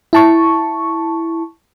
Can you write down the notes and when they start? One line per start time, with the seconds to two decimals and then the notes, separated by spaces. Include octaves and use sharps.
0.13 E4 A5 C#6